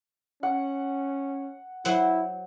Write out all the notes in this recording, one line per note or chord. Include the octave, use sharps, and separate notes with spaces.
C#4 F#5
F#3 E4 C5 F#5